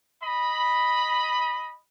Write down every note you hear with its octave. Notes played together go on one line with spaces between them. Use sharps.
D#5 B5